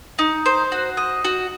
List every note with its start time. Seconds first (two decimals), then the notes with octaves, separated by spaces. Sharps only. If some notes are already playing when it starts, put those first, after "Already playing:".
0.19 D#4
0.46 C5
0.72 F#4
0.97 D#5
1.25 F#4